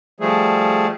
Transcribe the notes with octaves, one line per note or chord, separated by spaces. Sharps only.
F3 G3 A3 G#4